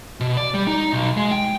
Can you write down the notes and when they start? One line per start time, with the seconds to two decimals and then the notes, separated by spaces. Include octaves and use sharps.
0.20 B2
0.37 D5
0.54 G3
0.67 D#4
0.93 B1
1.17 G#3
1.31 G5